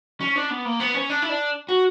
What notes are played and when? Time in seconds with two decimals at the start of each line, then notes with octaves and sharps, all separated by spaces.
0.21 C#4
0.36 D4
0.50 B3
0.65 A#3
0.80 B3
0.95 C#4
1.09 D4
1.22 E4
1.29 D4
1.69 F#4